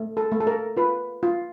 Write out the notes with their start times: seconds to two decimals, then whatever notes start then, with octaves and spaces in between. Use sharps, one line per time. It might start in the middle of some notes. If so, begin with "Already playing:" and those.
Already playing: A3
0.17 A4
0.32 A3
0.40 A4
0.47 A#4
0.77 F4 B4
1.23 F4